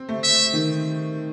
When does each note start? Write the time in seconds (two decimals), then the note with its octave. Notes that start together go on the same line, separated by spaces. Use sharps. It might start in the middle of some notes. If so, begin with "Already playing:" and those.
Already playing: C4
0.09 A3
0.23 E5
0.54 D#3